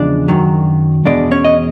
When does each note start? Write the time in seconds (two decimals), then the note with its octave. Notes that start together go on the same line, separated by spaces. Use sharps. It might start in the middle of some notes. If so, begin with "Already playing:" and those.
Already playing: E2 C#3 F3 G#3 D4 D5
0.28 F#2 D#3 F#3
1.05 E2 B2 G#3 D4 D5
1.31 C#4 C#5
1.45 D#5